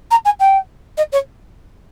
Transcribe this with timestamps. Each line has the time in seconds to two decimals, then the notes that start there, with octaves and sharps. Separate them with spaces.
0.11 A#5
0.25 G#5
0.40 G5
0.97 D#5
1.12 C#5